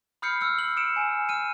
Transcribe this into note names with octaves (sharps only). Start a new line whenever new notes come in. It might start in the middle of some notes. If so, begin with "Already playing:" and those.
B5 D#6 F6 G6 C7 C#7
E6 F6
F#7
D#6 C#7 D7 E7
G#5
F6 D#7